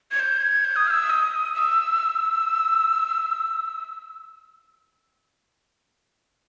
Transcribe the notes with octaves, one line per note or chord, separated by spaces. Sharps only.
G#6
G6
G#6
G6
D#6
F6
E6
D#6
E6